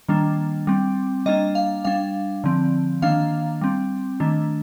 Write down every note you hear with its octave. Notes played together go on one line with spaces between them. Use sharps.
D#3 G3 A#3 D4
G3 C4
G3 A#3 D4 D#5
F5
G3 D4 F5
D3 F3 C4
D#3 A#3 D4 F5
G3 C4
D#3 A3 D4